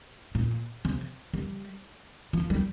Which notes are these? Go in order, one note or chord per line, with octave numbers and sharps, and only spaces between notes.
A#2
C3
G3
F3
G3